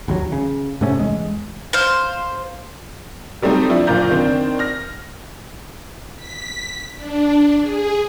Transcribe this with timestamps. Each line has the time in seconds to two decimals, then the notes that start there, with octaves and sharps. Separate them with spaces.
0.08 G#1 D#2 F#3
0.32 C#3
0.81 G#2 C3 A3 C#4
0.99 E2 G#3
1.73 C5 F5
3.42 F#3 G3 A3 C4 D#4
3.70 F3 D4 E4
3.87 F#1 A#2 F4 D5 A#5 G6
4.11 D#3 C4 D4
4.59 F6 A#6
6.16 B6
6.96 D4
7.61 G#4